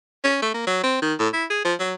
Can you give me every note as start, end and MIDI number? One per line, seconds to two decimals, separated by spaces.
0.24 0.38 61
0.42 0.51 57
0.54 0.64 58
0.67 0.80 54
0.84 0.99 60
1.02 1.14 51
1.19 1.28 45
1.34 1.45 64
1.50 1.62 68
1.65 1.74 53
1.80 1.94 54